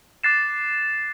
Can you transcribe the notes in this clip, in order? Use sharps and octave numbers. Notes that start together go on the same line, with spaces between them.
D6 F#6 A6 C7 E7